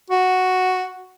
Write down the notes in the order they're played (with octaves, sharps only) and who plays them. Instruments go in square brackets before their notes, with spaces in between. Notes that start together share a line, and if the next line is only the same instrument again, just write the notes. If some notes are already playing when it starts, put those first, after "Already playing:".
[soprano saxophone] F#4